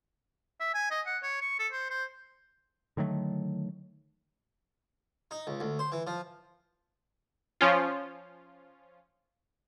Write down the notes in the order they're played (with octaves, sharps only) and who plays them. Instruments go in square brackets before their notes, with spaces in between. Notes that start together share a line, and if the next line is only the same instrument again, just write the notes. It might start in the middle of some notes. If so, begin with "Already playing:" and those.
[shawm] E5
G#5
D#5
F#5
C#5
C#6
A4
C5
C5
[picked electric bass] D3 D#3 F#3 A3
[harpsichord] D#4
C#2
D2
C5
E3
F3
[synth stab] F3 C#4 F4